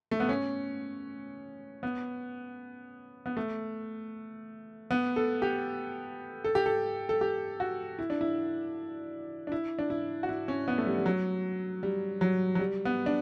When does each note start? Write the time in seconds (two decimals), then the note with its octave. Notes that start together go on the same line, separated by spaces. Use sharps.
0.11 A3
0.20 B3
0.29 C#4
1.83 B3
3.26 B3
3.37 A3
4.91 B3
5.16 A4
5.42 G4
6.44 A4
6.55 G4
6.66 A4
7.09 A4
7.21 G4
7.60 F#4
7.99 E4
8.10 D4
8.21 E4
9.47 D4
9.52 E4
9.79 D4
9.90 E4
10.23 F#4
10.29 E4
10.48 C#4
10.68 B3
10.78 A3
10.87 G3
10.98 G3
11.06 F#3
11.83 G3
12.21 F#3
12.55 F#3
12.60 G3
12.85 B3
13.06 D4